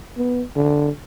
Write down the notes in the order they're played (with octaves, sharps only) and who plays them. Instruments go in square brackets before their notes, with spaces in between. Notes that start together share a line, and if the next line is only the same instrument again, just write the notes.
[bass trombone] B3
D3